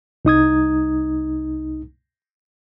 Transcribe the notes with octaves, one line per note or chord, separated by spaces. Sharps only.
C2 D#4 D#6 G#6